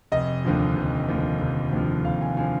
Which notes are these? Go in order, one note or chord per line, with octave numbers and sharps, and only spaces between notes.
F1 D#5
D#2 D3 F3
F1
D#2 D3 F3
F1
D#2 D3 F3
F1 F5
G#5
D3 F3 G#5